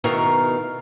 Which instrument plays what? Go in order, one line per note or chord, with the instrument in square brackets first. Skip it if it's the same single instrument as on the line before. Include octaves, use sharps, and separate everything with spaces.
[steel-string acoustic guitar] B2 D#3 A3 A#4 F5